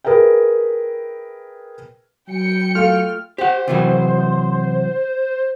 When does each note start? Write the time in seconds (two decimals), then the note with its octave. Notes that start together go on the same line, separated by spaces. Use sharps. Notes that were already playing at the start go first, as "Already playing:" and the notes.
0.04 G#4 A#4 B4 E5 G5
2.29 F#3 G5 C#7
2.75 A3 F4 F6
3.38 G4 C5 F#5
3.68 C3 E3 F#3